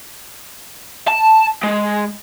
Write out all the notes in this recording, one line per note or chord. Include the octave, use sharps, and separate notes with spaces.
A5
G#3